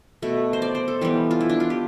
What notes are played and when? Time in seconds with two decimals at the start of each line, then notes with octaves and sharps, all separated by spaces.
0.22 B2 A3
0.53 C5
0.62 D5
0.75 C5
0.88 A4
1.01 E3 G3 B3 G4
1.31 F4
1.41 E4
1.50 D4
1.60 F4
1.70 G4